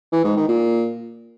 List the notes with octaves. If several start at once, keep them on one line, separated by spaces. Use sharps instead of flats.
E3
G#2
D#3
A#2